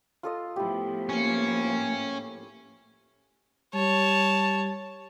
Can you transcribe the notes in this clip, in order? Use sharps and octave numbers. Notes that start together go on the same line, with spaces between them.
F4 A4 D#5
A2 F3 B3 E4 G4
A#3 C#4
G3 C#5 A5